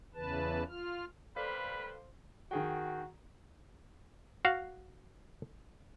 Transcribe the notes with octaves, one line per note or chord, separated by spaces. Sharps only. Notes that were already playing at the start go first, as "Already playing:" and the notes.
E2 C#3 E3 B4 A5
F4 F6
G3 A#3 A4 B4 C5 D5 F5 B5
D#3 F#4 G#4 G5
F#4 F5